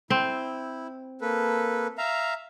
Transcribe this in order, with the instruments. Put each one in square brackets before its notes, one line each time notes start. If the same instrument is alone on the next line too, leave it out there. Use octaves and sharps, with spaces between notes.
[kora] C4 [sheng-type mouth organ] E4
[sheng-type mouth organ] A#3 A4 B4
E5 F5 A#5